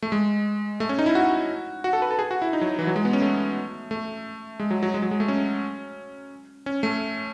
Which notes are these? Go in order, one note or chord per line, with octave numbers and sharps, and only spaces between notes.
A3
G#3
A3
C#4
D#4
E4
F#4
F#4
A4
B4
A4
G#4
F#4
E4
D#4
F#3
E3
F#3
G#3
B3
C#4
A3
A3
G#3
F#3
F#3
G#3
F#3
G#3
A3
C#4
C#4
A3